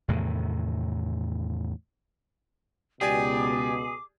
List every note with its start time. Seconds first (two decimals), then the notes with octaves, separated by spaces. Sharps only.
0.08 E2 A2 C3 D#3
3.01 C#2 B2 G4 G#4 D5 G#5 D6